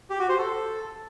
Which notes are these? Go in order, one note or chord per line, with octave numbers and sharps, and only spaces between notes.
G4
F#4
C5
A4